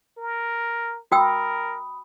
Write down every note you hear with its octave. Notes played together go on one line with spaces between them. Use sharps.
A#4
F#4 A#4 G5 B5 D#6 E6